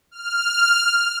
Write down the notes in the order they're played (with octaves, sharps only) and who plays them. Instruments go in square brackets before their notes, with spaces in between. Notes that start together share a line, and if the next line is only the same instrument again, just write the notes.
[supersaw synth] F6